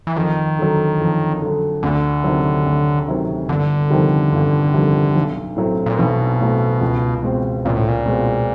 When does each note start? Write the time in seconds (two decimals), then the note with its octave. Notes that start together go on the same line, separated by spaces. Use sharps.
0.07 E3
0.16 F2 D#3
0.59 D3 F#3
1.00 F2
1.42 D3 F#3
1.83 D2 D3
2.24 C3 D#3 F#3
2.66 D2
3.08 C3 D#3 F#3
3.49 G1 D3
3.90 F2 C3 D#3 G3
4.33 G1
4.74 F2 C3 D#3 G3
5.16 B1
5.56 A2 F#3 A3 C4
5.86 A#2
5.98 B1 B2
6.40 A2 F#3 A3 C4
6.81 C#2
7.23 B2 G#3 C4
7.65 C#2 A#2
7.76 A2
7.88 A#2
8.06 B2 G#3 C4